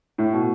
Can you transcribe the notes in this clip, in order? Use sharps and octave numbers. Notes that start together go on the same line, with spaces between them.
A2
B2